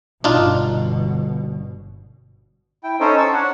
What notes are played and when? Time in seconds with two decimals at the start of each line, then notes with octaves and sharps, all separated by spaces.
0.24 G1 B2 D4 D#4 F4
2.84 E4 G5
3.00 C#4 D#4 A4 C5 C#5
3.18 A5 C#6 E6
3.33 D4 C#5 F#5